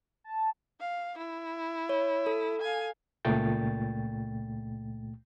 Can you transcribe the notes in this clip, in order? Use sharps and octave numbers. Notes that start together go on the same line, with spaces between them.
A5
F5
E4
C#5
A4
F5 G#5
C#2 A#2 A3 G5 A6